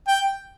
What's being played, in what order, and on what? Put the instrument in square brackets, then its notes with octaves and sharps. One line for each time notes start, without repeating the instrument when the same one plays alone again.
[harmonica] G5